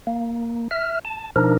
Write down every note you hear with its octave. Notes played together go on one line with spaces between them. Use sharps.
A#3
E5 F6
A5
B2 F3 D4 D#4 A#4